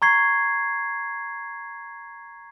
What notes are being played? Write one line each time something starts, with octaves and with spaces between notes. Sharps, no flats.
A#5 C#6 G#6 C7